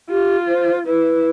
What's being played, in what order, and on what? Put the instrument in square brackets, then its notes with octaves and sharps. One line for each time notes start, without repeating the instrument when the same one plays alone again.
[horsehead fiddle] F4 [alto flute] G4
[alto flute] C5
[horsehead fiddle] E4 [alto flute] B4